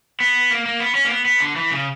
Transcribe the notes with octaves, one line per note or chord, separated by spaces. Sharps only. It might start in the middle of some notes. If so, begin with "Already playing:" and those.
B3
A#3
A#3
B3
C#4
A#3
B3
B3
D3
E3
C#3